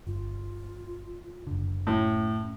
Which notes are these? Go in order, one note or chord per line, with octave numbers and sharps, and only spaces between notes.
G1 F4
F#1 D3
A2 C#4